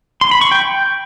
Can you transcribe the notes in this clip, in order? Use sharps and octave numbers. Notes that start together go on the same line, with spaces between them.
C6
B5
C#6
G5
G5